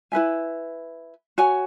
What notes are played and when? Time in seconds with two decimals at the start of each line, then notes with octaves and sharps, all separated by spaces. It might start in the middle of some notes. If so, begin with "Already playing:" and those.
0.12 E4 B4 E5 G#5
1.38 F#4 C#5 G#5